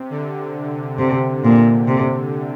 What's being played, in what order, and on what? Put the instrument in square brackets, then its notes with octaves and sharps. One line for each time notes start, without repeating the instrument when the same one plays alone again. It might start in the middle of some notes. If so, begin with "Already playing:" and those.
Already playing: [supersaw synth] C3
D3
[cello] C3
A#2
C3